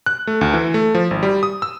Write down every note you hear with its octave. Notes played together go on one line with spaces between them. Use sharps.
F#6
A3
D2
E3
A3
F3
G#1
G3
D#6
E6